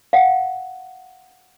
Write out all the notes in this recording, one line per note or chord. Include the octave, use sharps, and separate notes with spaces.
F5 F#5